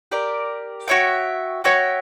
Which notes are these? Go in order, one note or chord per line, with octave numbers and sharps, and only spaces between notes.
G4 A#4 D5
F#4 C#5 E5 G5
F#4 C#5 E5 G5